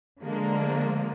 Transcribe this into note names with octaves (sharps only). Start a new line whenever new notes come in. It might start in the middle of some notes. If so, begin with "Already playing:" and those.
D3 F3 G#3 A#3